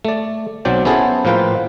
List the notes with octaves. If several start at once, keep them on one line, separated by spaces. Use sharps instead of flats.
A3 D5
B1 F#3 C4 D5 G5
B3 C#4 E4 G#4 A4 C5
A2 F3 A#3 F4 B4 G5